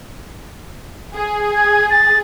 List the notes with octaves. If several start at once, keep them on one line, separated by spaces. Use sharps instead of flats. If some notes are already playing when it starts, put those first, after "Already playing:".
G#4
G#6
A6